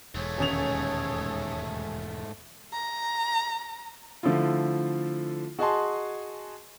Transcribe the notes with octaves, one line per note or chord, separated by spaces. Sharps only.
E1 G#2 A3 G#4 A4 C#5
D#1 C#4 F7
A#5
D3 F3 A3 E4 F4
F#4 G#4 D#5 G#5 A5 C6